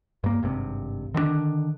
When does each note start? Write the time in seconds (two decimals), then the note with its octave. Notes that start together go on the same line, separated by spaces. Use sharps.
0.24 G2 A#3
0.43 G#1 G2 C3
1.14 D3 D#3 A3 D4